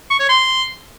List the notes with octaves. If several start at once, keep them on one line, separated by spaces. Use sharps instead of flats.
C#6
C#5
C6